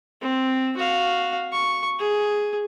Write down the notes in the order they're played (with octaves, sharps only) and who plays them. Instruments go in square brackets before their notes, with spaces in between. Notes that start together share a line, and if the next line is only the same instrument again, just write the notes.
[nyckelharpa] C4
F#4 F5
C#6
G#4